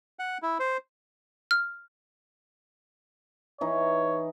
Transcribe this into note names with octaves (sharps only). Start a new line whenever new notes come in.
F#5
E4
C5
F6
E3 D#4 C#5